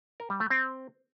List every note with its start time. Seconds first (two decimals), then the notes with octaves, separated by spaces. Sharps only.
0.20 A#4
0.30 G3
0.40 A3
0.50 C4